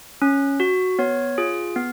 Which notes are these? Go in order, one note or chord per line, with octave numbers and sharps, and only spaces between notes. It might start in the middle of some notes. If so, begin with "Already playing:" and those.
C#4
F#4
B3 C#5
F4 G#4
B3